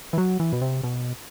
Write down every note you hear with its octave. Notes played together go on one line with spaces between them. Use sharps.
E3
F#3
E3
B2
C3
B2